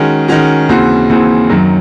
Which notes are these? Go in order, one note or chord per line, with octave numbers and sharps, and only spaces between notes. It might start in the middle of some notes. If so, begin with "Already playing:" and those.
Already playing: D#3 G#3 C#4 F#4
D#3 G#3 C#4 F#4
D#2 C#3 E3 C4 F#4
D#2 C#3 E3 C4 F#4
F#2 D#3 F#3